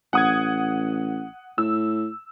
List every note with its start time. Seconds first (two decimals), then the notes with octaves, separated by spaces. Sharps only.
0.13 A1 F#5 D#6 G#6
1.58 A2 E6